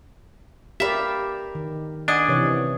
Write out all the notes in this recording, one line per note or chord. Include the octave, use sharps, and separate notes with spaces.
G4 A#4 D5 E5 F5 B5
D#3
D4 D#5 F#5 G#5
C3 E3 C#5